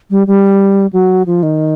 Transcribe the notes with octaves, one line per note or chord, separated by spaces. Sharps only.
G3
G3
F#3
F3
D#3